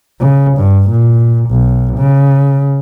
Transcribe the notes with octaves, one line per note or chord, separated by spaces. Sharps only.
C#3
G2
A#2
B1
C#3